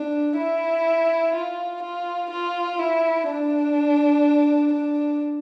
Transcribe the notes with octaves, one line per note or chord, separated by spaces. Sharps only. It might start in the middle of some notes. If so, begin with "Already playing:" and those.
Already playing: D4
E4
F4
F4
F4
E4
D4
D4